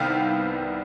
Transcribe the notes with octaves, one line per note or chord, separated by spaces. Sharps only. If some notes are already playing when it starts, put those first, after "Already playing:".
Already playing: C2 C3 D#3 G3 B3 F5 G5